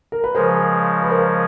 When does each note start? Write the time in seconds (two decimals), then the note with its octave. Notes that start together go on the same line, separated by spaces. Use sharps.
0.12 A#4
0.24 B4
0.35 C#3 F3 G#3 A#4 C5
1.02 B4
1.09 A#4 C5